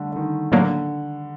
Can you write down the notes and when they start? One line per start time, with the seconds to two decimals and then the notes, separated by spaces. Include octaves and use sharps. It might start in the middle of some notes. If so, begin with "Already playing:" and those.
Already playing: D3 G3 A3
0.12 D3
0.16 D#3
0.52 A2 D3 F#3 A#3 D4